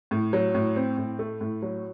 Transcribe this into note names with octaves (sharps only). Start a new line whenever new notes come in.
A2
F#3
A2
C4
A2
A3
A2
F#3